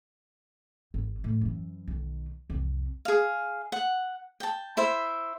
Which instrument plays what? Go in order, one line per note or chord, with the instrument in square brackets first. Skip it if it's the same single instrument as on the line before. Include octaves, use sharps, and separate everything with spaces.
[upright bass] G#1
A2
F#2 E3
B1 D#3
C2 F2
[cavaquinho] G#4 F5
F#5
G5 A5
E4 C5 E5